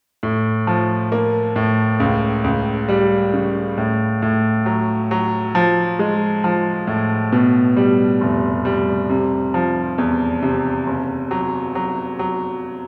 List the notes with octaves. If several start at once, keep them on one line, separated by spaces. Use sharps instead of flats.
A2
F3
A#3
A2
C#2
C#2
G3
C#3
A2
A2
F#3
F#3
F3
G#3
F3
A2
B2
G3
F1
G3
C3
F3
E2
C3
F#1
F#3
F#3
F#3